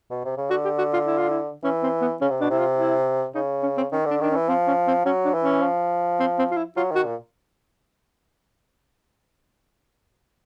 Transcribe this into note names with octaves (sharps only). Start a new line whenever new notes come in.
B2
C3
C#3
D3 F#4
G4
F#4
F4
E4
F4
E4
E3 C#4
C4
B3
C#3 C#4
C3
B2 D4
C3 E4
F4
E4
C#3 D#4
C#4
C4
D#3 C#4
D3 D4
D#3 D4
C#4
E3
F3 C4
C#4
C4
F#3 C#4
D4
E3
C#4
F3
C4
C4
F4
E4
F#3 F4
D#3 F#4
A#2